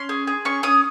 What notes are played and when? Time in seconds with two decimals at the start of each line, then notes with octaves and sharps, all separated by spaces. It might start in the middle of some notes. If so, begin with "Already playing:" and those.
Already playing: C#4 C6
0.09 G#4
0.27 G#4
0.45 C#4 C#6
0.63 C#4 D#6